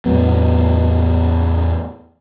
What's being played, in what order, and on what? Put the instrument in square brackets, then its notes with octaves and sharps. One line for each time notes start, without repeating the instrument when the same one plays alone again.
[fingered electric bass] E2 A2 F#3 B3